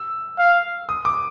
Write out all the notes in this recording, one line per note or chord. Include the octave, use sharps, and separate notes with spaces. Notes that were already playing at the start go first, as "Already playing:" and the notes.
Already playing: E6
F5
D#6
D6